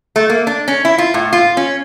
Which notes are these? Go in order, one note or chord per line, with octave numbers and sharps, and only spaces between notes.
A3
A#3
D4
C#4
E4
F4
A2
F4
C#4